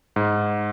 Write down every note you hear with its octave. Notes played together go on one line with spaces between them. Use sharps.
G#2